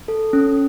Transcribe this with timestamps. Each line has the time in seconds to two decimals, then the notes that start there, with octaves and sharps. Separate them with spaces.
0.08 A4
0.33 C#4